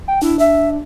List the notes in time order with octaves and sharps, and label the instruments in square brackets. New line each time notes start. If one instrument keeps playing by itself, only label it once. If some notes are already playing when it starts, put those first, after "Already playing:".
[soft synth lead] G5
[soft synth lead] D4 [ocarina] E4
[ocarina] E5